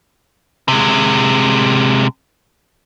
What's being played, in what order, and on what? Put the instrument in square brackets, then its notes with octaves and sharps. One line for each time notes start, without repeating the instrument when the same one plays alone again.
[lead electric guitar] C3 G#3